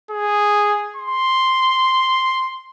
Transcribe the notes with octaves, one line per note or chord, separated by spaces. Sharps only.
G#4
C6